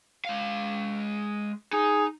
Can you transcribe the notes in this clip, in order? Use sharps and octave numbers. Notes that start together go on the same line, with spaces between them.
G#3 F5
D#4 G#4